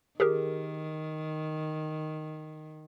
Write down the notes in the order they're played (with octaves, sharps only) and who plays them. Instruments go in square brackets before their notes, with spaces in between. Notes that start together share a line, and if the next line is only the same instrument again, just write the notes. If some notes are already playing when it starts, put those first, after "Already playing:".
[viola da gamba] D#3 [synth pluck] G4 G#4 A#4